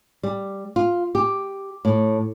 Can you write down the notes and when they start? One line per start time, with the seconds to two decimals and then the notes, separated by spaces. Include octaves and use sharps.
0.23 G3
0.76 F4
1.15 G4
1.85 A2